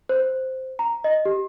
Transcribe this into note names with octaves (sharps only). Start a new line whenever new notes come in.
C5
A#5
D#5
G4